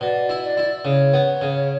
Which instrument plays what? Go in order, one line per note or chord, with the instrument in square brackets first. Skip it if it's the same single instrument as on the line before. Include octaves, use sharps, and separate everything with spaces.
[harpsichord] B2 [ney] D5
[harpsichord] E4
[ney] D5
[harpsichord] E4
[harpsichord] C#3 [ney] C#5
[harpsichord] B3
C#3